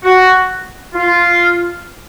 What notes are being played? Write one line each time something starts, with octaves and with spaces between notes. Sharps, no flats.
F#4
F4